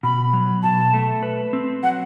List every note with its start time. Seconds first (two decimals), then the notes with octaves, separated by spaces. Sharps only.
0.03 B2 B5
0.33 F#3
0.63 B2 A5
0.94 A3
1.23 B4
1.53 C4
1.83 F#3 F#5